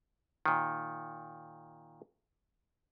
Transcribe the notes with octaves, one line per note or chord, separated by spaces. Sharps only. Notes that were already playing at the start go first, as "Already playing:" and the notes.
A#2 D#3